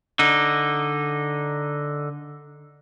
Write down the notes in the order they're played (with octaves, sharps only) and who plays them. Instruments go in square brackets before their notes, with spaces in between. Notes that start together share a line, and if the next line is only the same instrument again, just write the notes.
[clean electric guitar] D3 D#4